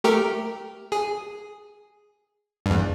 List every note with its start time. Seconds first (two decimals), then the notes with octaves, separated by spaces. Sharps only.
0.04 A3 G4 A#4
0.92 G#4
2.66 E2 G2